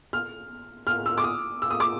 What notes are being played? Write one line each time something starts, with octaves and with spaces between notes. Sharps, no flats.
F6
F6
E6
D6
D#6
E6
D#6
D6